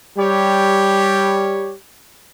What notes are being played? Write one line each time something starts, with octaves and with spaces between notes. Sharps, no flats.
G3 G4 C#5